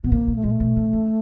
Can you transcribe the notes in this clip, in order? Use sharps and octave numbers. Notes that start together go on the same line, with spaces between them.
B2 B3
C3 A#3
B2
A3
A#2 G#3
A3
B2
C3
C#3